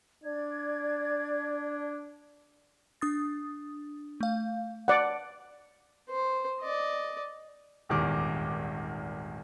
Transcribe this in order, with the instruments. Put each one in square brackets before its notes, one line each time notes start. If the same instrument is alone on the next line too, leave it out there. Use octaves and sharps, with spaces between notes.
[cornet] D4 [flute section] D5 G#6
[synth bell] D4 D#6 A6
A3 F5
[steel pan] D5 F#5
[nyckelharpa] C5
D5 D#5
[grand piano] D#1 G#1 E2 D#3 D6